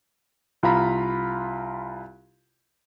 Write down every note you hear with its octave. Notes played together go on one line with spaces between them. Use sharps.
C2 F4 F5 A#5 B5